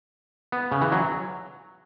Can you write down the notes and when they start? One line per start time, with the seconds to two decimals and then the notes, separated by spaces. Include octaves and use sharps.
0.52 B3
0.72 C#3
0.81 E3
0.92 F#3